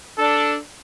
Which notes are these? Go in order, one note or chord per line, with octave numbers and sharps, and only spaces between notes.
D4 A4